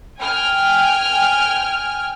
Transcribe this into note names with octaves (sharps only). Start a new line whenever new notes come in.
G5 G#5 F6